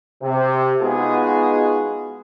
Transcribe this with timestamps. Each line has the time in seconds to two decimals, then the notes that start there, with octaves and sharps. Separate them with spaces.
0.22 C3
0.82 G#3 B3 D#4 F4 F#4 G#4